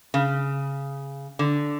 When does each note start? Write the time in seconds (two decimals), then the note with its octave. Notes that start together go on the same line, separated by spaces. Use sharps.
0.14 C#3
1.39 D3